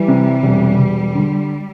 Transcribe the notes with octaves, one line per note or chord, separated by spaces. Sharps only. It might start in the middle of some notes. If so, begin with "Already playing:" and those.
Already playing: E3 G3
C3
E1
E1
D3